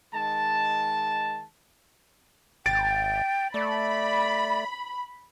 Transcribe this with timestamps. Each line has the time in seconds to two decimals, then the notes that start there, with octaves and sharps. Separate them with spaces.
0.14 D#3 G#3 A5
2.66 G#1 G5 A6 D7
3.54 A3 D5 B5